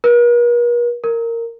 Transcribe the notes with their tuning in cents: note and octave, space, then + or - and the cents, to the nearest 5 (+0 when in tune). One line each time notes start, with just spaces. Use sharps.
A#4 +45
A#4 -15